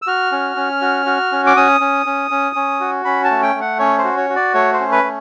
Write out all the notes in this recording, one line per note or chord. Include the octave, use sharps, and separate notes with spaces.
E6
F#4 F6
C#4
C#4
F#4
F#4
C#4
D6
C#4 D#6
C#4
C#4
C#4
C#4
F#4
C#4 B5
A5
A3
G5
A3
F#5
C#4 C#5
C5
F#4
C#5
F#4
D5
A3 C#5
C5
C#4
B4
A3